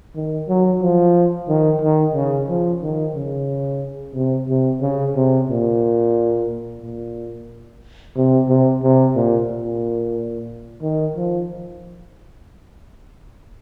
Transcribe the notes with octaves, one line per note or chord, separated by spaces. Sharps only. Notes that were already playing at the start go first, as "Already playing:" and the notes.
D#3
F#3
F3
D#3
D#3
C#3
F3
D#3
C#3
C3
C3
C#3
C3
A#2
A#2
C3
C3
C3
A#2
A#2
D#3
F3